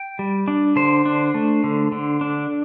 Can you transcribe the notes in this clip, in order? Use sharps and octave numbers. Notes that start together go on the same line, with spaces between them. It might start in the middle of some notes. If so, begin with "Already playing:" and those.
Already playing: G5
G3
D4
D3 C5
D4
A3
D3
D3
D4